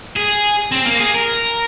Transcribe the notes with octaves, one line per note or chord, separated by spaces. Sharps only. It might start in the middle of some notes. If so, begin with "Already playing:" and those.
G#4
C4
A#3
G#4
A#4